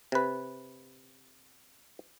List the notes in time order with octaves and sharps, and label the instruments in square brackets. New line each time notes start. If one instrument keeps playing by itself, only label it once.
[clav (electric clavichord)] C3 B4